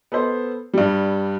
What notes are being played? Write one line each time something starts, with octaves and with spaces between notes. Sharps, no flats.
B3 A4 C5
G2 G3